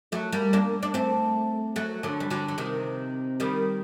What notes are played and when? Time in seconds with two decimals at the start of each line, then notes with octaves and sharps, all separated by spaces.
0.12 F#3 A3
0.33 G3 A#3
0.53 A#3 D4
0.83 D4
0.94 A3 C4
1.76 F#3 A3
2.03 D3 F#3
2.20 G3
2.30 D3 F#3
2.48 F#3
2.58 C3 D#3
3.40 D#3 G3